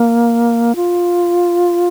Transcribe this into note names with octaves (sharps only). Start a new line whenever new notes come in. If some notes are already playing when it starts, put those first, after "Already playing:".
Already playing: A#3
F4